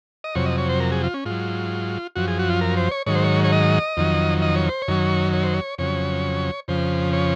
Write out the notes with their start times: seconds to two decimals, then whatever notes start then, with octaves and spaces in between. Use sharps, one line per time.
0.24 D#5
0.35 F2 C3 F#3 C#5
0.46 D#5
0.58 C#5
0.69 C5
0.80 A#4
0.92 G#4
1.04 F4
1.14 C#4
1.25 G#2 F#3 F4
2.16 F#2 F3 F#4
2.28 G#4
2.39 F#4
2.50 F4
2.61 A#4
2.77 C5
2.91 C#5
3.06 G#2 D#3 F#3 C#5
3.15 C5
3.24 C#5
3.44 C#5
3.52 D#5
3.97 F2 D#3 F#3
4.42 D#5
4.56 C#5
4.69 C5
4.82 C#5
4.88 F#2 D#3 F#3
5.33 C#5
5.43 C5
5.54 C#5
5.78 F2 C#3 F#3 C#5
6.68 F2 C#3 F3 C5
7.13 C#5